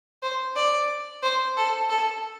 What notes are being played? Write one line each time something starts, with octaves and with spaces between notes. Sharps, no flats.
C5
D5
C5
A4
A4